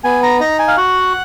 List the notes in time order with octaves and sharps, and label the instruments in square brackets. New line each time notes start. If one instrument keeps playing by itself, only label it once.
[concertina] B3 G#5
A#5
D#4 A#5
G#5
F5
F#4 F#5